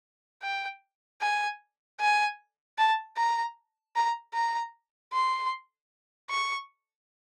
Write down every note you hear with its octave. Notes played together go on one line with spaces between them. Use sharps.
G5
G#5
G#5
A5
A#5
A#5
A#5
C6
C#6